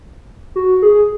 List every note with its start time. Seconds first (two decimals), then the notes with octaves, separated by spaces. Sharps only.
0.56 F#4
0.82 G#4